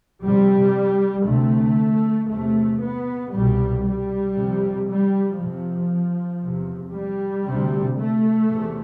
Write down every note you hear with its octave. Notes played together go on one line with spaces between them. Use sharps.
F2 C3 G3
D2 C3 A3
E2 C3 A3
B3
C2 B2 G3
G3
F2 C3
G3
F2 C3 F3
E2 C3
G3
D2 C3
A3
E2 C3